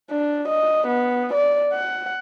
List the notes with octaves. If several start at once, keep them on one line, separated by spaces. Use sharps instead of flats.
D4
D#5
B3
D5
F#5